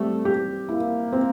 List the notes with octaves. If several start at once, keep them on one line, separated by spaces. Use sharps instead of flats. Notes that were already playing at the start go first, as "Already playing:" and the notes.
Already playing: G3 A3 C4
G4
A#3 E4
C4